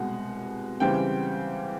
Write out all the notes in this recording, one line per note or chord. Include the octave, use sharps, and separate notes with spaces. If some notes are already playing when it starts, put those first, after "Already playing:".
Already playing: C2 B2 G#3 F#5
C#3 E3 G3 C4 G5